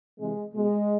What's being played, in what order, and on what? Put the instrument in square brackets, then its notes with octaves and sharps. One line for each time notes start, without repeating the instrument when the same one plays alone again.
[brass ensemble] C3 E3 G#3
B2 G#3